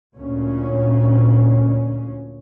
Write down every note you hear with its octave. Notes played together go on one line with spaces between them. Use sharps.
D2 A#2 C#4